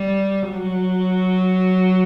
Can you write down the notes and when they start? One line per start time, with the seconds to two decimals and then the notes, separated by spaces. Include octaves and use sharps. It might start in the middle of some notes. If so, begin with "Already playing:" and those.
Already playing: G3
0.50 F#3